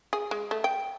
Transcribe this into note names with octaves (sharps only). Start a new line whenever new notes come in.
G#4
G#3
A3
G5